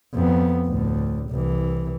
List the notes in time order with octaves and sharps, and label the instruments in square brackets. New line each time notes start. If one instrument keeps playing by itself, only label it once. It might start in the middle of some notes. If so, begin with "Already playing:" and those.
[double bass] F2 B3
D2 A2
C2 E3